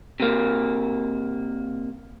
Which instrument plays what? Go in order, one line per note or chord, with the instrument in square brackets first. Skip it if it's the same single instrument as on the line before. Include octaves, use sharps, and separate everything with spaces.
[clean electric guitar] C3 A#3